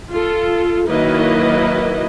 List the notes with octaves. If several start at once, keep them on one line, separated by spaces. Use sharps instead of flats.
F4 A4
D#3 F#3 A#3 E4 B4 D#5